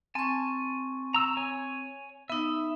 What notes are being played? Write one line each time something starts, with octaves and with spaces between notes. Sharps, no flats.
C4 G#5 A5 C#6
A#5 E6
C#5 G#5
B3 D#4 E5